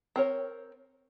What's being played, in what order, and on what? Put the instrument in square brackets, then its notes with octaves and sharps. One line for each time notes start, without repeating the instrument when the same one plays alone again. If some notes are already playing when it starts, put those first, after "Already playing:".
[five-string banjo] C4 A#4 C#5